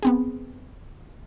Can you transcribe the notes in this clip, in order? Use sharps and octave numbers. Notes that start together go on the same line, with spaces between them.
B3 C4 G#4